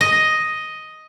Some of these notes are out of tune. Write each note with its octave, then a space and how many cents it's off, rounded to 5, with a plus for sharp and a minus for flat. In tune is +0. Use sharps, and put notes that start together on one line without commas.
D#5 +5